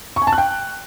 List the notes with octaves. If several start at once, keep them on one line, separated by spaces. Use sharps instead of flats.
C#6
G#5
A5
F#6
G5